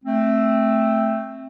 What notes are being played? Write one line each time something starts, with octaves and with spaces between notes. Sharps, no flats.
A3 C4